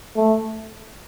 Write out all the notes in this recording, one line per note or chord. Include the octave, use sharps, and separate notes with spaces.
A3